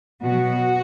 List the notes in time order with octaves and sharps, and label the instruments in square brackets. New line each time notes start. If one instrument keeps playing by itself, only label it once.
[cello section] B2 F#3 F#4